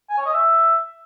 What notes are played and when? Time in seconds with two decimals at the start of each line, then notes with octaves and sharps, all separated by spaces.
0.10 G#5
0.18 C#5
0.25 D#5
0.33 E5